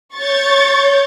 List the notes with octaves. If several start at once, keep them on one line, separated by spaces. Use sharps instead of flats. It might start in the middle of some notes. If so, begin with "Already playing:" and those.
C#5 C#6 G6 A6